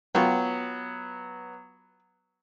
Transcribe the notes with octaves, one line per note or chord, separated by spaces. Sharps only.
F#3 B3 F4 F#4 G5